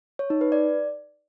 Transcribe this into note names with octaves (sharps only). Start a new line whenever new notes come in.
C#5
D#4
B4
D5